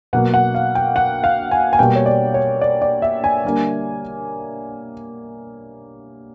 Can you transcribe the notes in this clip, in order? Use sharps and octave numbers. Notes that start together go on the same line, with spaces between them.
B2 F#3 A#3 F#5
F#5
F5
G5
F#5
F5
G#5
G#5
B2 G3 A#3 G5
C#5
D5
C#5
D5
D5
E5
G#5
D3 G3 A#3